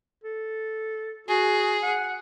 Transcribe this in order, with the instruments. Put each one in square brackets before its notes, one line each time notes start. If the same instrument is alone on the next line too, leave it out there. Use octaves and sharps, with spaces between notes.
[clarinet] A4
[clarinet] F#4 [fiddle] G#4
[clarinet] F#5